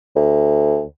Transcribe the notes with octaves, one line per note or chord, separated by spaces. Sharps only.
D2